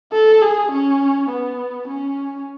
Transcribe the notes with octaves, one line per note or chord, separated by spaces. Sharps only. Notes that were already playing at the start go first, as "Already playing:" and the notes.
A4
G#4
C#4
B3
C#4